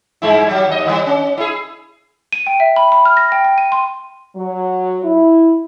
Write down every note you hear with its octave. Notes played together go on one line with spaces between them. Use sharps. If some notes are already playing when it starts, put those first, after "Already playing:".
G2 G#3 E4
F#3 G3
D#2 D#5
D#3 G3
C#4
E4 G#4
D#7
G5
E5
B5
B5
F6
A#6
G5
G5
D#7
C6
F#3
E4